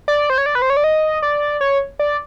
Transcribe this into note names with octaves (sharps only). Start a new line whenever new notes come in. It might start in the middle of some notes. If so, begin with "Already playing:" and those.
D5
C5
C#5
D5
B4
C5
C#5
D5
D#5
D5
C#5
D5